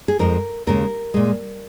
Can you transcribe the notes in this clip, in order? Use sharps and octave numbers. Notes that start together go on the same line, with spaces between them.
G#4
F2 F3 G#3 A#4
D#2 C#3 G#3 A#4
A#2 G#3